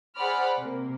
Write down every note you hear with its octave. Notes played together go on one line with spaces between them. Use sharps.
G#4 C5 D5 F#5 B5 F6
C3 A#3